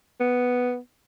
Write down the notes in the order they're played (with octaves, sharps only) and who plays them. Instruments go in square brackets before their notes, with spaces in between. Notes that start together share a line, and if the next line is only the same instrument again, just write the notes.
[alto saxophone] B3